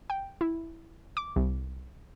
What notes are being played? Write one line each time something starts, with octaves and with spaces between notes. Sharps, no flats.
G5
E4
D6
C2